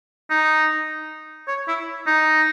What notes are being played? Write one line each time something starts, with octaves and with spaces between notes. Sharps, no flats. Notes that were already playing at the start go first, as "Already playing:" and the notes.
D#4
C#5
E4
D#4